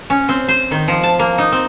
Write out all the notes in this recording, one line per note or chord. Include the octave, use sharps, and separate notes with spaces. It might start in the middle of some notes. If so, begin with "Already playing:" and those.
C#4
C4
C5
D#3
F3
A5
A#3
D#4
C4